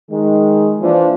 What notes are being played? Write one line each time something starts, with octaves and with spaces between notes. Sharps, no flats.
D#3 G#3
E3 F3 A#3 D4